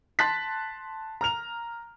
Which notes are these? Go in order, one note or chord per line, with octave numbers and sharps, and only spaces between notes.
A5 C6 F#6 A6 B6
A#5 F6 F7